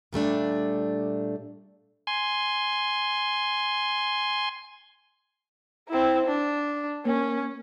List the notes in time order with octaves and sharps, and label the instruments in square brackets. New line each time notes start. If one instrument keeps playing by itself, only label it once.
[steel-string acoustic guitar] A#2 G3 A3 D4
[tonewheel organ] G#5 C6
[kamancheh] C4 E4
D4
[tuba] A#3 [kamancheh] C#4